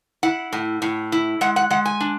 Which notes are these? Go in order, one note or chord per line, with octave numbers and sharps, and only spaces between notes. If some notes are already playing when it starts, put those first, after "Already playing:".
E4 F#5
A2
A2
E4
G#3 F#5
F#5
G#3 F#5
G#5
D4